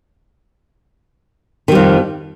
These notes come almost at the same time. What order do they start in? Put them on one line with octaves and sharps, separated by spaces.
D#3 G3 F2